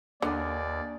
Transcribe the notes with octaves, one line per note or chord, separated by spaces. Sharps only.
D#2 D3 A#3 D4 D5 G#5